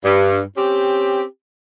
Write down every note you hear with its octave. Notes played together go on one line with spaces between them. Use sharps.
G2
C4 C#4 G4